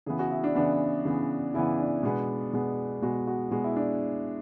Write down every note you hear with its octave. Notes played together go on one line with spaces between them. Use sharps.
C#3 E3 B3 G#4
F#4
E4
D4
C#3 E3 B3 D4
C#3 E3 B3
C#3 E3 B3 E4
D4
B2 G#3 B3
B2 G#3 B3
B2 G#3 B3 F#4
F#4
B2 G#3 B3 F#4
E4
D4